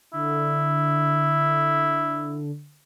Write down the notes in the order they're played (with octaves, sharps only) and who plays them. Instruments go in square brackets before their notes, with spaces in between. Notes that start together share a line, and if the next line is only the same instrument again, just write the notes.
[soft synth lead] D3 [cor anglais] E4